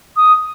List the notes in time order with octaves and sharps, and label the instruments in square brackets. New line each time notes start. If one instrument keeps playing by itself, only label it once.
[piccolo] D#6